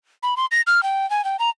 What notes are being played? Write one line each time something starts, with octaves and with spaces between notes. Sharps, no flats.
B5
C6
A#6
F6
G5
G#5
G5
A#5